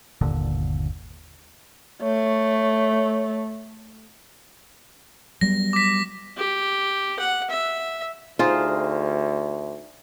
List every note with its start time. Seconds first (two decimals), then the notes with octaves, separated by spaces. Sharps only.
0.21 G1 D#2 A#2 D3
2.03 A3 C#5
5.41 F#3 G3 B3 A#6
5.73 D6 B6
6.37 G4
7.19 F#5
7.50 E5
8.39 D2 D#4 F4 G#4 C5